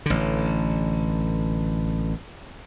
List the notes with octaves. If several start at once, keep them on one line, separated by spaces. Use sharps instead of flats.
A1 D3